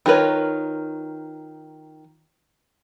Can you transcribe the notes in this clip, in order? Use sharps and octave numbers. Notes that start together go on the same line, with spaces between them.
D#3 F4 A#4 B4 C#5